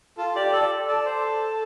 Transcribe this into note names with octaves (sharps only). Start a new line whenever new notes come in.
F4 A4
G4 D5
A4 D5
A4 D5
C5